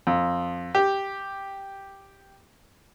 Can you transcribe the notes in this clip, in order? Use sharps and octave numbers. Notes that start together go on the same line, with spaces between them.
F2
G4